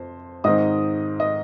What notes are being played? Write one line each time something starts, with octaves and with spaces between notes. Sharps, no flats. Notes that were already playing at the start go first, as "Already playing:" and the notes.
Already playing: F2 C5
G#2 D#3 C4 D#5 D#6
D#5